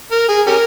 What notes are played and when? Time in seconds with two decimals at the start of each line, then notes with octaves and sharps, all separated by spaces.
0.12 A#4
0.29 G#4
0.47 C#4 G4 A#4